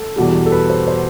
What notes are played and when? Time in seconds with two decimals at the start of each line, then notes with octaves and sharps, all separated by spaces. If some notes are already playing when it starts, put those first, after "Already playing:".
Already playing: A4
0.16 E2 B2 G3
0.46 A4
0.52 B4
0.70 C5
0.88 C5